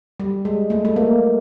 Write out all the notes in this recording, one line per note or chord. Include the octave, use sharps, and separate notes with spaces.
G3
G#3
A3
A3
A#3